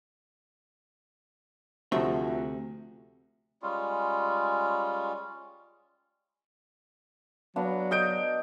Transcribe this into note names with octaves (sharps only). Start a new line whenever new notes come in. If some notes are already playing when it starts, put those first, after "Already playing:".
D2 C3 F3 A3 F#4 E5
G3 G#3 C#4 F4
F#3 B3 D4 F5
D#5 D#6 G6 D7